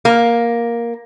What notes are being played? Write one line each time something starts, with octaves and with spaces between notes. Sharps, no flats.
A#3